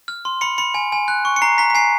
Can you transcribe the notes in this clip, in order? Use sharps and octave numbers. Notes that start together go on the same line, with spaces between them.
F6
C6
B5 C#7
B5 C#7
G#5
G#5
F#6
C#6
C#7
A#5 C7
A#5 B6
B6
G#5 C7